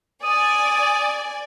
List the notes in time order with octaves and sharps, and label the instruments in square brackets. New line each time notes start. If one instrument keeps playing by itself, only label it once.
[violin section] D5 G#5 [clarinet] D#6